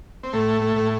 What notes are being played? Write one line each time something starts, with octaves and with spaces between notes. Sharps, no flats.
C4
A2 A3
A3
A2